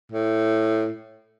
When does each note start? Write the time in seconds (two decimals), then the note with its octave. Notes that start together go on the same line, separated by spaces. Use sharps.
0.12 A2